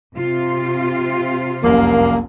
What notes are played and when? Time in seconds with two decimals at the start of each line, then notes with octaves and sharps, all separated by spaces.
0.16 C3 F4
1.64 F1 C2 F#2 A#3